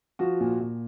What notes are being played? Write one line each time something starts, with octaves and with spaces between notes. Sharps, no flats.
F3 F#4
A#2
A#2